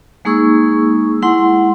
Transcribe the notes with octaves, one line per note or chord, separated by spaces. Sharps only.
G#3 A#3 D#4 G#4 C#6 E6
G#3 E4 F#5 C6